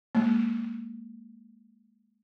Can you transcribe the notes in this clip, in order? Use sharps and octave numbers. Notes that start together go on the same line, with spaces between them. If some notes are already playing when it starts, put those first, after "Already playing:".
G#3 A#3